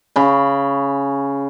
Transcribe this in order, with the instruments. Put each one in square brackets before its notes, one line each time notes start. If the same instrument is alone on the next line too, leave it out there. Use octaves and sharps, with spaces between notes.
[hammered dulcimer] C#3 B5